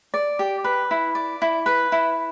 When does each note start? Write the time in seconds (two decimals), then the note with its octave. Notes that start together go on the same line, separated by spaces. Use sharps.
0.14 D5
0.39 G4
0.64 B4
0.91 E4
1.15 D5
1.42 E4
1.66 B4
1.92 E4